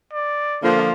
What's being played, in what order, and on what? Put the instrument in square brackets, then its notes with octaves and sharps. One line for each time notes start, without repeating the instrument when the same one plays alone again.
[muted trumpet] D5
[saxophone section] D3 F3 [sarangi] A#3